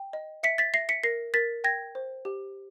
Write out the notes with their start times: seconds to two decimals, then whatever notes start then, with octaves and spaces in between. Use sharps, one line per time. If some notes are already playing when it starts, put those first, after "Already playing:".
Already playing: G5
0.13 D#5
0.43 E5 B6 C#7
0.58 A6 B6
0.74 E5 A#6 C7
0.89 B6 C#7
1.03 A#4 A#6 C7
1.34 A#4 A6 B6
1.64 G5 G#6 A#6
1.95 C5
2.25 G4